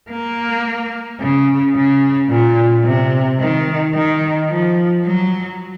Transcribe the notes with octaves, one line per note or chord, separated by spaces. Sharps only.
A#3
C#3
C#3
A#2
C3
D#3
D#3
F3
F#3